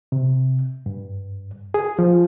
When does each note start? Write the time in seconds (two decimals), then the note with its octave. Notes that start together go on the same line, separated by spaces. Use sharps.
0.12 C3
0.86 G2
1.74 G#4
1.99 F3